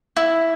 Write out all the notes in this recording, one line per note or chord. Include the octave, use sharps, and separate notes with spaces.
E4